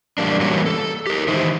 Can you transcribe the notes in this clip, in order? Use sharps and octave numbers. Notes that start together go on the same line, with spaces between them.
E2 G3 A#3 D4
E3 G3 A#3 C#4 F#4
A4
G4 A#4
D#3 E3 D#4 E4 C5